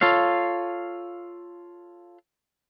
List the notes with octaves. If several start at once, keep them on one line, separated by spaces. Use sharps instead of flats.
F4 A4 C#5 F5